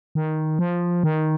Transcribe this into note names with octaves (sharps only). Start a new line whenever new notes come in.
D#3
F3
D#3